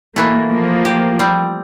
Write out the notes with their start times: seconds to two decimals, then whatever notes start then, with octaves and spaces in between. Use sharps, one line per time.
0.16 B2 E3 A3 A#3
0.48 F3 A#3
0.85 G4
1.19 G3 C4